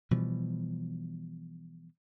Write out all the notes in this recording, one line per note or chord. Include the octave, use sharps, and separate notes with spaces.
B2 E3 F3 G3